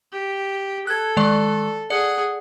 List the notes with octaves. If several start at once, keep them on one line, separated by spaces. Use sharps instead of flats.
G4
A4 F#6 G#6
D#3 G#3 D5
G#4 D5 F#5 C#7